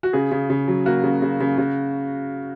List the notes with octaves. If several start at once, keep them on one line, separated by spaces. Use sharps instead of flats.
F#4
C#3 G#4
C#3
C#3
F#3
A#3 F#4
C#3
C#3
C#3
C#3